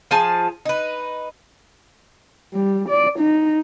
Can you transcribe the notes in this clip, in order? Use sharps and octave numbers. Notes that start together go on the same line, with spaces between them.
F3 F4 G#4 A5
D#4 B4
G3
D5
D#4